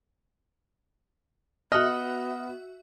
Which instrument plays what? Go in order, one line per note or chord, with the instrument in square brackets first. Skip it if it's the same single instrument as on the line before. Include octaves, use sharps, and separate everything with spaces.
[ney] B3 [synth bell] F#4 E5 [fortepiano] D#5 [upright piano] F6 F#6